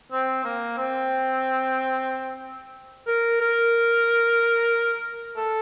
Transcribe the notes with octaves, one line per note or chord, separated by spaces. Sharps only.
C4
A#3
C4
A#4
A#4
A4